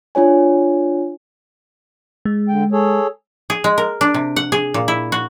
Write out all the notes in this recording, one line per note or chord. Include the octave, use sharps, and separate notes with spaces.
D4 F4 C#5 G#5
G#3
D3 G5
G#4 A4 C#5
G#4
G#3
A#4
D4
C3
F#5
G#4
A#2
E4
F#4